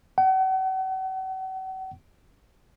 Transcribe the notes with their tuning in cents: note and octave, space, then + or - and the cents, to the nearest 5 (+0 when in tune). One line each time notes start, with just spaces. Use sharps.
F#5 +40